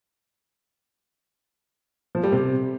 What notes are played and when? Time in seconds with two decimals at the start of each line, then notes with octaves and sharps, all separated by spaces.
2.15 F3
2.24 G3
2.32 C3